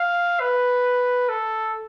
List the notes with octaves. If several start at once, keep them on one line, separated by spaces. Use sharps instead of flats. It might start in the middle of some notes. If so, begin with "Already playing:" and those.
Already playing: F5
B4
A4